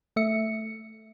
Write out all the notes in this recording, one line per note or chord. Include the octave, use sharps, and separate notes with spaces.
A3 E5 C#7